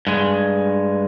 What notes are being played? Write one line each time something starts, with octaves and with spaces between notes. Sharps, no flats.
G2 G#3